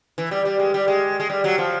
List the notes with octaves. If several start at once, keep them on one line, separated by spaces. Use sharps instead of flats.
E3
G3
G3
G#3
G3
G#3
G#3
G3
F#3
F3